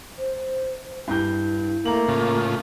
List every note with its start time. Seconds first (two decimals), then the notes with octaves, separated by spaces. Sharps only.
0.19 C5
1.08 G2 E4 G6
1.85 A3 A#3 A#5 F#7
2.08 A2 C#3 F4